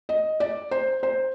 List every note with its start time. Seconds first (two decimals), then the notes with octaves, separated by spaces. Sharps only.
0.09 D#5
0.40 D5
0.71 C5
1.03 C5